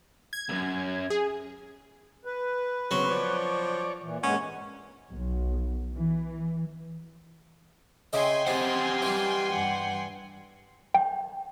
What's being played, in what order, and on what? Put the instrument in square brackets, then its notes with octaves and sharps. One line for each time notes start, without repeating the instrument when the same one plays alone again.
[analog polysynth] G#6
[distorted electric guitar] C#2 F#2
[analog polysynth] G#4
[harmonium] B4
[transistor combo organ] C#3 B3 C4 [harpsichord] F#3
[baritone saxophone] F3 [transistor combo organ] C#5 D5
[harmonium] A#2 E3
[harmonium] G2 G#3 F#5 [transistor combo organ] A#3 [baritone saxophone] C#4
[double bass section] B1
E3
[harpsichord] C#3 E4 D#5 [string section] G5 G#5 C6
[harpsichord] C4 [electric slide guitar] G4 D#5 F#5
[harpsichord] E3 G3
[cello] G2 F#5
[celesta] G5